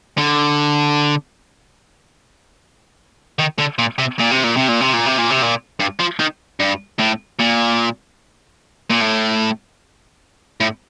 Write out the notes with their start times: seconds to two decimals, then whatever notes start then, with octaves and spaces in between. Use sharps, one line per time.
0.18 D3
3.39 D#3
3.59 D3
3.79 A#2
3.98 C3
4.19 A#2
4.31 C3
4.44 A#2
4.56 C3
4.69 A#2
4.81 C3
4.94 A#2
5.06 C3
5.18 A#2
5.31 C3
5.43 A#2
5.80 G2
5.99 F3
6.19 D#3
6.60 G2
6.99 A2
7.40 A#2
8.90 A#2
9.01 A2
10.61 A2